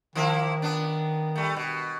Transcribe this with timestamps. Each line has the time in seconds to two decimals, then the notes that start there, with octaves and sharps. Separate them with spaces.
0.15 D#3 F3 A#3 E4
0.62 B3 D4
1.36 G3 A3
1.56 B2